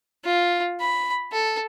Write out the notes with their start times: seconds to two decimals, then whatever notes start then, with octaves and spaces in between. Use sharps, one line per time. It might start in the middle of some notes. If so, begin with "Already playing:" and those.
0.25 F4
0.80 B5
1.32 A4